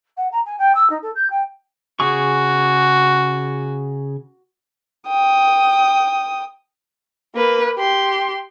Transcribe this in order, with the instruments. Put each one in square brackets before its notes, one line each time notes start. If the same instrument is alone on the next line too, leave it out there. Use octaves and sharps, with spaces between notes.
[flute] F#5
A#5
G#5
G5
E6
D#4
A4
G6
G5
[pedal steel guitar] C#3 G#4 C#6 [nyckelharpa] F#4
[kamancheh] G5 D#6
A#3 B4
G4 C6